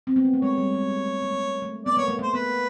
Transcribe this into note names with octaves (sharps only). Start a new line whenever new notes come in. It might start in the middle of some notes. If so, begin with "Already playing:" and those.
C4
B3
A#3
A3
G#3 C#5
G3
G#3
A3
A3
A#3
A3
A#3
A3
B3 D5
A#3 C#5
A3
A#3 C5
B3 B4